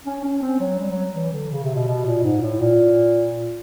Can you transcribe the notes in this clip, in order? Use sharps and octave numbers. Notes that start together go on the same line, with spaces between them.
C#4
C#4
C4
F#3
G3
F#3
E3
D3
C#3
C3
B2
B2
A#2
G#2
A2
A#2